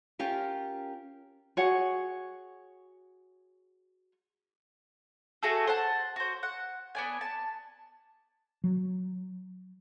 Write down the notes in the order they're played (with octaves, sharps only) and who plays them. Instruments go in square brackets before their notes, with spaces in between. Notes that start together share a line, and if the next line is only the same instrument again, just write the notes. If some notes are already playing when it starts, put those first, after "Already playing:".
[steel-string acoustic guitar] C#4 F4 G4 A#4
[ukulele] F#4 G#4 C#5 F#5
[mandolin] A3 F#4 G#4 A4
C5 F#5 A5
F#4 C5
F#5
B3 D4 G#5
A5
[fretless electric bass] F#3